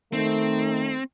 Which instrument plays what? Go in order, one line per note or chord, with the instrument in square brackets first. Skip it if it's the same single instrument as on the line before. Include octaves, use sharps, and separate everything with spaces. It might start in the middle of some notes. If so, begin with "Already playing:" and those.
[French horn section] D#3 A3 [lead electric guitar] C4